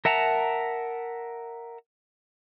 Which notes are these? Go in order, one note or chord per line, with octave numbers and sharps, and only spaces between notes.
A#4 E5 F#5 A5 A#5